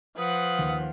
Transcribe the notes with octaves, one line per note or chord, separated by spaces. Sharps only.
F3 B4 F#5 D#6
D#2